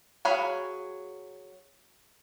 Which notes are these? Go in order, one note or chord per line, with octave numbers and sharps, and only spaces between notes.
F#3 G#4 C#5 F5 B5